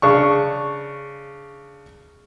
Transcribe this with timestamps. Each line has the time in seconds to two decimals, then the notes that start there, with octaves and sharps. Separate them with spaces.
0.02 C#3 D4 C#6